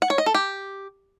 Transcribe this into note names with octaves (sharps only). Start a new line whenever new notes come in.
F#5
C#5
D#5
A4
G4